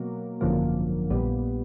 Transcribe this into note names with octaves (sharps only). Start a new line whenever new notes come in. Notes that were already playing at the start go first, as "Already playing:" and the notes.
Already playing: B2 F#3 A#3
G#1 F#2 D3 F3 A#3
A#1 A#2 G3 B3